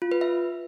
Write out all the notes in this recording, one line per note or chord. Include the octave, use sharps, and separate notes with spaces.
F4
B4
E5